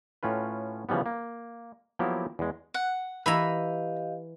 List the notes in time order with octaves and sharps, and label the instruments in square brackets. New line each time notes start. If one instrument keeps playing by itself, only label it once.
[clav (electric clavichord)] A2 C#4 F4 B4
C#3 E3 F3 G3 B3
A#3
F3 F#3 A#3 B3 E4 G4
E2 G#3
[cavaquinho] F#5
[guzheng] E3 E4 A#5 [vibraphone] G4 D#5 F5 [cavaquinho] B5